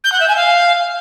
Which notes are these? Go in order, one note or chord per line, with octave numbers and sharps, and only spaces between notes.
G6
F#5
E5
G#5
F5